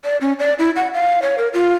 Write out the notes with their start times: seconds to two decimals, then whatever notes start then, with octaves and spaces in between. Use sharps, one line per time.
0.04 D5
0.21 C#4
0.39 D5
0.59 E4
0.76 F#5
0.94 F5
1.22 C#5
1.38 A#4
1.54 F4